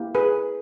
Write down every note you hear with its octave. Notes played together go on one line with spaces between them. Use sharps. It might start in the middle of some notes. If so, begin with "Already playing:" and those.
Already playing: A#3 E4 G4
G#4 B4